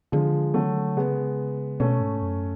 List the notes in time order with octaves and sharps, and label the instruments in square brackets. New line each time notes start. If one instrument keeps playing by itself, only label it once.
[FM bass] D3 [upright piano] F3 G#3
[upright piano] F#3 A3
[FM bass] C#3 [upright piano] G#3 B3
[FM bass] B2 [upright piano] A3 C#4
[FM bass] G#2
F#2